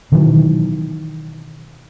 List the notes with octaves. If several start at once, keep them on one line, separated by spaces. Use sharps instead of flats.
B2 D#3 E3 F#3